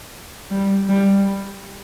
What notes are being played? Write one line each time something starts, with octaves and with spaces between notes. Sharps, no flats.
G3
G3